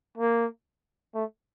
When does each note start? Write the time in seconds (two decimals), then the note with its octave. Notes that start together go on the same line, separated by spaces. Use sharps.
0.17 A#3
1.14 A3